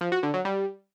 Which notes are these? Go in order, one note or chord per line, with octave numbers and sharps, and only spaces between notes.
F3
F#4
D3
F#3
G3